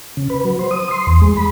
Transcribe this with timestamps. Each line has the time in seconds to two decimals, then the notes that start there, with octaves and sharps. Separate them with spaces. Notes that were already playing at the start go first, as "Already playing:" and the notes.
0.17 C#3
0.30 B4
0.45 F#3
0.59 C5
0.71 D#6
0.91 C6
1.07 E2
1.22 G#3
1.37 B5